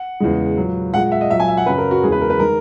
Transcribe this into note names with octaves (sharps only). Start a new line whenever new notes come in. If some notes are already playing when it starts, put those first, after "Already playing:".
Already playing: F#5
E2 C#3 G#3
A#2 F#3
A#2 G#3 F#5
E5
D#5
A#2 F#3 E5
G#5
E5
F#5
F#2 C#3 F#3 B4
A#4
F#4
E2 C#3 G#3 G#4
B4
A#4
B4
D#3 G#3 A#4